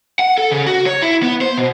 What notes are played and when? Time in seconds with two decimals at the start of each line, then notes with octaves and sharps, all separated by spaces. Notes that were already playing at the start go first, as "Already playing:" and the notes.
0.19 F#5
0.38 A4
0.52 C#3
0.66 F#4
0.86 C#5
1.02 E4
1.23 B3
1.41 C5
1.58 B2